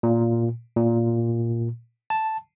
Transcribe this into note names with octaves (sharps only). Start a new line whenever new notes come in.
A#2
A#2
A5